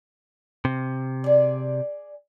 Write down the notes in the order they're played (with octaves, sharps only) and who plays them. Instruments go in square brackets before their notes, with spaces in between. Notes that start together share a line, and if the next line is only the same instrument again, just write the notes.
[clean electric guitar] C3
[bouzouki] G#4 D5